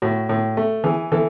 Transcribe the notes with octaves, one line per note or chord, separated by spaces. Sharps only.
A2 F#4
A2
A3
E3 G#4
E3 A4